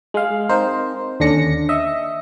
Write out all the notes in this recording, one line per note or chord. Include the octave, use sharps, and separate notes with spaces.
G#3 F5
C4 D#4 A#4 C5
D#2 D3 C#4 D4 A#6 C#7
D#5 E5